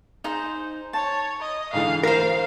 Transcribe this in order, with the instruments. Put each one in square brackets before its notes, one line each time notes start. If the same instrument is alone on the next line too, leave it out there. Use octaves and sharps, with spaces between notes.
[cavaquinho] D#4 G#4 C5
[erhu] C#5 [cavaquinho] A5
[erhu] D#5
[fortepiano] G#2 D3 E3 [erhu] F5
[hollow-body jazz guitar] A#4 C5 [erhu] F5